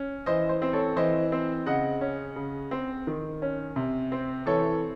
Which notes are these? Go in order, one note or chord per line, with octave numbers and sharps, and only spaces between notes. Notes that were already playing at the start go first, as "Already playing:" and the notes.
Already playing: C#4
E3 C5 D#5
C5
C4
A4 C#5
E3 C5 D#5
C4
C#3 D#5 F#5
C#4
C#3
C4
D#3
C#4
C3
C4
E3 A4 C#5